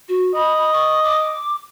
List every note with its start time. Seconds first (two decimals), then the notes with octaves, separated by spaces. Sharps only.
0.09 F#4
0.35 D#5 B5
0.73 C#6
1.04 D6